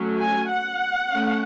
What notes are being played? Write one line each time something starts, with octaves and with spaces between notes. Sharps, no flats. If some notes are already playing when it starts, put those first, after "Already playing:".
Already playing: F#3 A3 C#4
G#5
F#5
A3 C#4